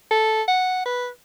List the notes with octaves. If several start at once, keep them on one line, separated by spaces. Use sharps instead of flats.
A4
F#5
B4